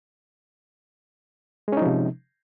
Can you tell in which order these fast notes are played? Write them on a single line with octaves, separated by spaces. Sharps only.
G#3 C#4 D#4 F3 C3